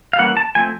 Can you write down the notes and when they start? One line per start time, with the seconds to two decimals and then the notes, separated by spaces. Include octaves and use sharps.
0.13 F5
0.18 E3 G3 A#3 C#4 F#5
0.37 A5
0.55 F3 A3 C4 G#5